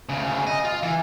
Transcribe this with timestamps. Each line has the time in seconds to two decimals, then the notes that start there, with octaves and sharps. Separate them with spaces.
0.09 D2 C#3
0.47 D#5
0.65 F4
0.83 E3